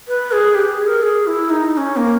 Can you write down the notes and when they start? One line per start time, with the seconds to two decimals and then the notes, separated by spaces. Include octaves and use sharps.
0.08 B4
0.32 G#4
0.55 G4
0.71 G#4
0.87 A#4
1.03 G#4
1.27 E4
1.50 D#4
1.74 D#4
1.78 C#4
1.97 A#3